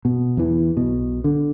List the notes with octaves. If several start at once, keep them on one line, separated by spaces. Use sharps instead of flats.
B2
E2 E3
B1 B2
D3